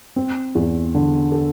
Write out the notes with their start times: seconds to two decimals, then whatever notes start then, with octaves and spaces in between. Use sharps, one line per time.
0.16 C4
0.55 E2
0.95 D3
1.32 A4